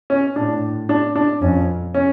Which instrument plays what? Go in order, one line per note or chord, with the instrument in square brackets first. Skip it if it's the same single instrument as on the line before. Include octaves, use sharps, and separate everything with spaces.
[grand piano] C#4
[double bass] A2 [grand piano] D4
[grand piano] D4
D4
[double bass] F2 [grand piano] C#4
[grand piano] C#4